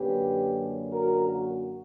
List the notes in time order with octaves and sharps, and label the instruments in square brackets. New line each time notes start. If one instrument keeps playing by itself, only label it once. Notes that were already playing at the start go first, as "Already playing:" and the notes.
Already playing: [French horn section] F#2 D3 A#3 C#4 G4 B4
F#4 A#4
F#4